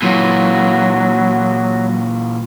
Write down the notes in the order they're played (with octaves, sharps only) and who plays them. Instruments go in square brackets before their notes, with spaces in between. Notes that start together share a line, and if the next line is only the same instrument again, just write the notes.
[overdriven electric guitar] A#2 E3 [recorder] F#3